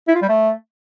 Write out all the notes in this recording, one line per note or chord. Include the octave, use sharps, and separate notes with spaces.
E4
F4
G3
A3